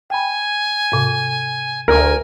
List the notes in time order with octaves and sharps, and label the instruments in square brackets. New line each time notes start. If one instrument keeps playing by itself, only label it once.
[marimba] G5 B5 [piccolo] G#5
[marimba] G#2 C3
[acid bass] D2 [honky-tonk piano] A#4 [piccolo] G#5